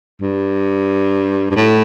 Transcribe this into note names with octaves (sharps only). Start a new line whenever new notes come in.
G2
G2
A2